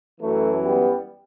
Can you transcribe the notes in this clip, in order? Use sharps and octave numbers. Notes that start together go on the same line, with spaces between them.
F#2 E3 F#3 A3
G3 B3